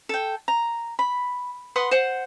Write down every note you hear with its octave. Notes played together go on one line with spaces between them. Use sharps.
A4 G5
A#5
B5
B4 F#5 C6 D#6
C5 F#5